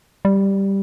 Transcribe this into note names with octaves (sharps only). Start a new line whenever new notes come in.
G3